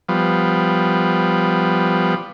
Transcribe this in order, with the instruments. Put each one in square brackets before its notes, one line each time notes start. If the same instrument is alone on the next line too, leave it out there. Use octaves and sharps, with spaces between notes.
[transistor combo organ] F3 G3 B3